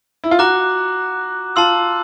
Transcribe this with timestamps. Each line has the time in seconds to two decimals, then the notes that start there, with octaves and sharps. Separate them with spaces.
0.24 E4
0.31 F4
0.39 F#4 A#5 D6 F#6
1.56 F4 A5 C6 E6